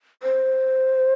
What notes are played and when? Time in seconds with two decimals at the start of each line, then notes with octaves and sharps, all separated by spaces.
0.23 C5